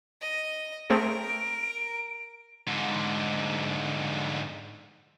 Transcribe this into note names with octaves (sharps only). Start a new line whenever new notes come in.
D#5
A3 C4 G#4 A#4 D7
G#2 D3